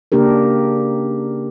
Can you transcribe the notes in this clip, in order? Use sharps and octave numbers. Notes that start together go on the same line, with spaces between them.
C#3 A#3 D4 G4 A#4